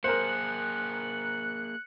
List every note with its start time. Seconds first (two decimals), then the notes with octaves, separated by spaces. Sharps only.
0.04 A#3 G#4 A#4 C5 F#6 C#7